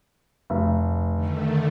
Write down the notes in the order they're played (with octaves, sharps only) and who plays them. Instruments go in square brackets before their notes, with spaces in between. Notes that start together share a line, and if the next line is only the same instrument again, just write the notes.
[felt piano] F1
[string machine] D3 D#3 A3